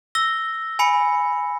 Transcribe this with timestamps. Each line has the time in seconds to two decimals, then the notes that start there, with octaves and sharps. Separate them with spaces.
0.15 E6 A#6 G7
0.79 G#5 B5 C#7